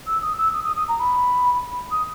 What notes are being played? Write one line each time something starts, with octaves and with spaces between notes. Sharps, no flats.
E6
D#6
E6
D#6
D#6
D#6
A#5
B5
D#6